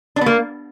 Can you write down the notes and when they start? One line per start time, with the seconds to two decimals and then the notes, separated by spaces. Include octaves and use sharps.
0.16 D4
0.21 B3
0.26 A#3